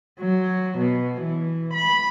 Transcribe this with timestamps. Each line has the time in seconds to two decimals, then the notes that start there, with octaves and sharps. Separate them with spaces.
0.20 F#3
0.78 B2
1.21 E3
1.74 B5